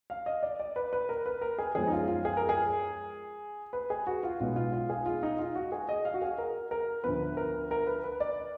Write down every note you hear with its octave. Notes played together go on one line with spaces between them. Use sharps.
F5
D#5
D5
D5
B4
B4
A#4
B4
A#4
G#4
F#2 F3 G#3 B3 G#4
D#4
F4
F4
G#4
A#4
G#4
B4
G#4
F#4
F4
B1 B2 G#3 B3 F4
F4
F4
G#4
F4
D#4
F4
F#4
G#4
D#5
F5
F#4
G#4
A#4
A#4
D2 D3 F3 B3 B4
A#4
A#4
B4
B4
D5